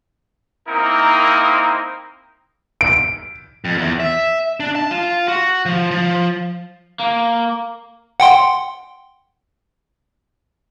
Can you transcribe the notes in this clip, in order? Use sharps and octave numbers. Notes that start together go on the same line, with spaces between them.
A#3 C4 D#4 E4 A#4
D7
F2
E2
E5
D4
A5
F4
F#4
F3
F3
A#3
F#5 G5 C6